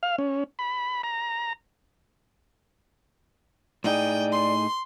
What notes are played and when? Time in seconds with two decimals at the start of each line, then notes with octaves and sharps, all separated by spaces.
0.03 F5
0.18 C#4
0.59 B5
1.03 A#5
3.84 A2 D#4 G#4 D5 G5
4.32 C6